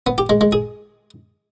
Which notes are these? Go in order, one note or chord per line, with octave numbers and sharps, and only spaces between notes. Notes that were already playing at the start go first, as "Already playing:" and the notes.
B3
G4
G#3
G#3
G#4